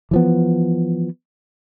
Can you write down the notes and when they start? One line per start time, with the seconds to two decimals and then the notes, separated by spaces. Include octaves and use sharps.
0.11 E3 F3 B3